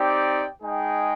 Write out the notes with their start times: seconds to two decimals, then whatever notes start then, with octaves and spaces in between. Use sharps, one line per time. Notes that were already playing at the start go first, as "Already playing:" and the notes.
Already playing: C4 D#4 G4 D5 G5
0.62 G#3 D#4 G#4 D#5 G5